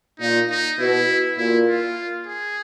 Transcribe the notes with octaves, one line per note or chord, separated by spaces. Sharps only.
A#2 D#4
D#4
B2 E4
A#2 E4
F4
G#4